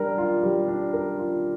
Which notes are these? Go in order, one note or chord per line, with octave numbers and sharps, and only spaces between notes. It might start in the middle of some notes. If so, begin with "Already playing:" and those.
Already playing: G3 D4 A#4
F4
G3
D4
A#4
F4